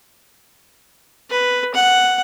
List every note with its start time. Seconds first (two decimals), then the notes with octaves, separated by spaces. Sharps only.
1.30 B4
1.74 F#5